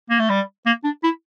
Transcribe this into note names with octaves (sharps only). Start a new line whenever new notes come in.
A#3
A3
G3
A#3
D4
E4